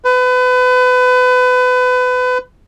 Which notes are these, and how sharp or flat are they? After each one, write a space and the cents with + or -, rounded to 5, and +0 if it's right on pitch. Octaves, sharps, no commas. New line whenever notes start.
B4 +30